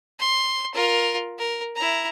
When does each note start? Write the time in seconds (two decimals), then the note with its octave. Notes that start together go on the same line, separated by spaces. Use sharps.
0.20 C6
0.74 F4 A#4
1.39 A#4
1.76 E4 A#5